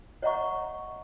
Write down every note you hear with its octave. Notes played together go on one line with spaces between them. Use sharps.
C#5 D#5 E5 F#5 A#5 C#6